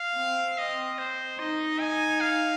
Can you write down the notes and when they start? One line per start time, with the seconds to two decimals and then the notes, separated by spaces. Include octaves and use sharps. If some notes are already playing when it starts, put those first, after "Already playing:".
Already playing: F5
0.17 C4
0.58 D#5
0.98 C5
1.39 D#4 D#5
1.80 G#5
2.21 F5